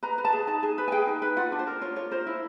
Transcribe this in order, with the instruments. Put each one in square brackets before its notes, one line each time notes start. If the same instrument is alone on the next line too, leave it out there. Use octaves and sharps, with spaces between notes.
[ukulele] B4 A#5
B4
A5
G#4
D#4 A5
G#4
B4
G#5
G#4 G5
D#4
B4
F4 F#5
D4
C5
A#4
F4 C#5
F4 C#5
A#4 C5
E4